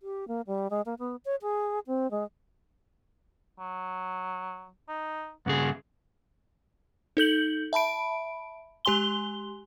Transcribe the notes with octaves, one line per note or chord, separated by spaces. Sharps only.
G4
A#3
G3
G#3
A#3
B3
C#5
G#4
C4
G#3
F#3
D#4
G2 C#3 G#4 F#5
D#4 A4 G6 F#7
E5 A5 B5 D7
G#3 G4 G#5 C6 G7